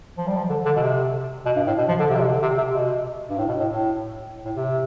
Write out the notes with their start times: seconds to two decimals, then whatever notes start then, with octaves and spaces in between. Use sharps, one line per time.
0.17 F3
0.27 G3
0.37 F3
0.50 D3
0.66 D3
0.76 B2
0.82 C3
1.46 B2
1.56 G2
1.67 A2
1.78 B2
1.89 F3
1.99 D3
2.10 C3
2.16 B2
2.21 C3
2.32 D3
2.42 C3
2.58 C3
2.74 B2
3.30 G2
3.38 A2
3.49 B2
3.60 A2
3.70 A2
4.45 A2
4.56 C3